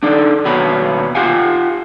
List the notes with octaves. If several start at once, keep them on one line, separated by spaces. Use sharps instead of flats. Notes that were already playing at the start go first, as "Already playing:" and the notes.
D4 D#4 A4 D5
D#2 B2 B3 F#4 C#5 B5
F4 G4 F5 F#5 G#5